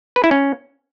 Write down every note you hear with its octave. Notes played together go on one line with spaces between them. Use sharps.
B4
E4
C#4